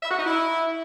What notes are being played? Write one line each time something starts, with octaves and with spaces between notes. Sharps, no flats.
E5
F#4
D#4
E4